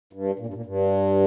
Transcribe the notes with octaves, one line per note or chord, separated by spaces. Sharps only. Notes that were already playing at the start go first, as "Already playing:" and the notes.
G2
A#2
G2
A#2
G2